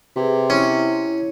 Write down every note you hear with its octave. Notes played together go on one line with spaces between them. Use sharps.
C3 G#4 B4
C#4 E4 C#5